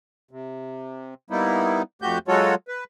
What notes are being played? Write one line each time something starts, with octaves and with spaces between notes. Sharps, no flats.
C3
G3 A#3 B3 D#4 E4
F2 F3 A3 F#4 G4 G6
F#3 G#3 F4 F#4 A4 C#5
B4